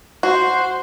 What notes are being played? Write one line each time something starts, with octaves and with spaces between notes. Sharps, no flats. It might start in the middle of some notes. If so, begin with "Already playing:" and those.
F#4 C5